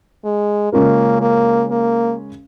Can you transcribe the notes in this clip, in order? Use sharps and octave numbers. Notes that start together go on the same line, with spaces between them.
G#3
C#3 G#3 A#3 C#4 F4 A#4
A#3
A#3